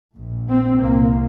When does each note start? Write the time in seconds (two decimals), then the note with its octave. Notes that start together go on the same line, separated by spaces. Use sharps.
0.16 A#1 A#2
0.49 C4
0.81 C2 A#2 A#3